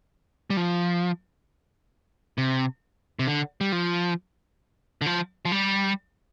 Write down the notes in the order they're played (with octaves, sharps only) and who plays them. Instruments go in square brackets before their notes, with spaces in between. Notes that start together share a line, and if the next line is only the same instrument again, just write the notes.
[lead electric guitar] G3
F3
C3
C3
D3
G3
F3
D3
F3
F3
G3